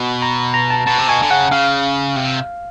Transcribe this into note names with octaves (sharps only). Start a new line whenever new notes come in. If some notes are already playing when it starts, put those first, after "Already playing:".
Already playing: B2
A#5
A#5
A5
B2 A5
C3
B2 G#5
D3
C#3 F#5
C#3 F5
C3